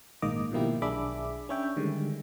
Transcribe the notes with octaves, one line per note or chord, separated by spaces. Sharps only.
A#1 G#2 D#3 A#3 D#5 D6
B2 D#3 F3 A#3 E4 G4
B1 D4 G#4 E5 B5 D6
C#4 D4 C#5 E5 G5
D3 D#3 G3 G#3